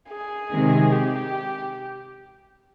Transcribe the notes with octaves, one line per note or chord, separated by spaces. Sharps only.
G#4
C3 D#3 G#3
G4